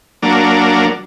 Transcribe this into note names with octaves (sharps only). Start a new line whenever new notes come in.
F#3 A#3 D4